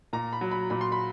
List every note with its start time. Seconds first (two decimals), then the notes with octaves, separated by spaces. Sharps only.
0.13 A#2 A#5
0.33 B5
0.41 F#3
0.51 B5
0.70 A#2 B5
0.81 C6
0.92 B5